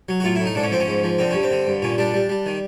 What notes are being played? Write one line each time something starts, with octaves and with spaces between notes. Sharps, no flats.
F#3
F#4
A2 F4
E4
A2
D#4
G#2 D4
C#4
F3 C4
C#4
G#2
F3
D3 C4
G2 C#4
C4
D3
G2
A#2 C#4
G3 D4
G3
G3
D#3